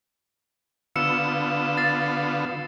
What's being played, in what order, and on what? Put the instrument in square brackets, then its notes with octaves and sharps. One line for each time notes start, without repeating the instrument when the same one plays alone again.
[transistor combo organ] D3 B3 F4 [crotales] E6 C#7 E7
[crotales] A6 C7